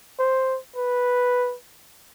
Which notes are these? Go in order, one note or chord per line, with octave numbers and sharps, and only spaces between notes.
C5
B4